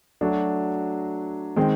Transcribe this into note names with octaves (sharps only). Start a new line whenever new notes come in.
F#3 A3 D4 F#4
D#3 G#3 C4